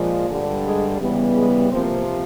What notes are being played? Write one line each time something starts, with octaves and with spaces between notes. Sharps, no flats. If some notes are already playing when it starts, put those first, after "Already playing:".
Already playing: A#2 F3 G#3
G2 D3 G3
G#3 G#4
C#3 E3 G3 B3
G#3 G#4
C3 F3 A#3 C4 C5